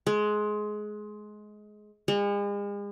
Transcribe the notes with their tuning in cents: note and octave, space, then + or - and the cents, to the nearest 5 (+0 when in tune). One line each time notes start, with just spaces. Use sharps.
G#3 +20
G#3 -40